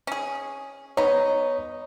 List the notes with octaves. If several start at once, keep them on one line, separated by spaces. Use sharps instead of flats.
C#4 G#4
B3 D#4 C#5